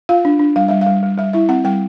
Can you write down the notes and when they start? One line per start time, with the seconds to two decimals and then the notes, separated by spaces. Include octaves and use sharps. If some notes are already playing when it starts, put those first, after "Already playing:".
0.09 F4 F5
0.25 D4
0.39 D4
0.56 G3 F5
0.68 G3 E5
0.81 F5
0.87 G3
1.03 G3
1.18 G3 E5
1.33 E4 E5
1.49 C4 F#5
1.65 G3 G5